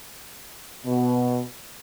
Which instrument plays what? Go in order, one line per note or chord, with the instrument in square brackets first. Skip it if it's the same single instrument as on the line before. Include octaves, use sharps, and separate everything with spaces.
[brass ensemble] B2